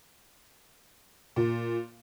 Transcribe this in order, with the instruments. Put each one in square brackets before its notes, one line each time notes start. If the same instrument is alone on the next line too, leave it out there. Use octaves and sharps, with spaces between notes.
[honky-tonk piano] A#2